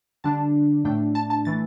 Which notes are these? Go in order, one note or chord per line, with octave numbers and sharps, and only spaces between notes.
D3 G3 D4 A5
A2 A3 D4 G5
A5
A5
E3 A3 A6